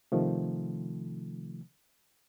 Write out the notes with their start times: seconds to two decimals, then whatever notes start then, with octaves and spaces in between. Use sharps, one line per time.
0.12 C3 D#3 F3 A3